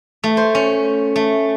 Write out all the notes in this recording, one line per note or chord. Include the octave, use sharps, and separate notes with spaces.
A3
C5
C#4
A3